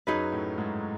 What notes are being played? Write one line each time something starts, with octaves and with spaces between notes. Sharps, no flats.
F#2 F#3 D#4 G#4 B4
A2 A3
G#2 G#3